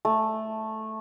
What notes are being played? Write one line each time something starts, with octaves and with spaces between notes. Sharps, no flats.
A3